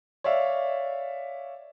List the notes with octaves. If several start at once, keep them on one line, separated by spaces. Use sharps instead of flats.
C#5 D5 E5 F5